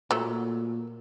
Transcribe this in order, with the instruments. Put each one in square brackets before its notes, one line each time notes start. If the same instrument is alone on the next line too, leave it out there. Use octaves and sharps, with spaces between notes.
[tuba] A#2 [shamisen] F#3 A3